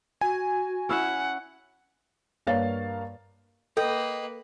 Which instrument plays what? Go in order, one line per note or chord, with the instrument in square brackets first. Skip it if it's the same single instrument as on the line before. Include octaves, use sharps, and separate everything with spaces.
[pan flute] F#4 [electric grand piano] G#5
[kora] C#4 E4 E5 [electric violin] F#5
[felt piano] G2 A#3 C#5 F5 A6
[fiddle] A#3 B4 [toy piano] A4 [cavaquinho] D#5 G5